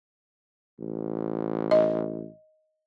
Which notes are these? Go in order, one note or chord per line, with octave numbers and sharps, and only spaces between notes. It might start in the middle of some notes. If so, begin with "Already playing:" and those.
A1
D#5